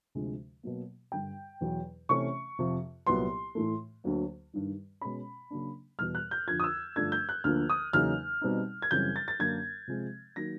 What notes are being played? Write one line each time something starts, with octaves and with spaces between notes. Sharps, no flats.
D2 C3 F3 G#3
B2 F#3 A#3
G2 D3 G3 G5
E2 B2 F#3
C3 E3 A3 C#4 C#6
F2 C3 F3
C2 A#2 F#3 B3 C6
A2 E3 A3
D2 D3 F#3 A#3
G2 D#3 G3
B2 G#3 C#4 B5
C#3 F#3 A#3 D4
E2 B2 G3 F6
F#6
G6
F2 D3 F3 G#6
D#6
E6
G2 D3 F3 A3 D4 G#6
G6
F#6
D2 D3 F3 A#3 F6
D#6
E2 C#3 F#3 A#3 D#4 F6
B2 G3 C4 D#4
G#6
F#2 C#3 E3 G3 C4 G6
A6
A6
F#2 D3 F#3 A#3 D4 G#6
C3 F3 G#3 C4
D#3 F#3 A#3 A#6